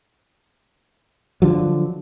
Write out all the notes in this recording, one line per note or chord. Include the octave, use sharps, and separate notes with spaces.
D3 F3 F#3